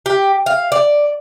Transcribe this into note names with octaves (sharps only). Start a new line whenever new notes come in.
G4
F5
D5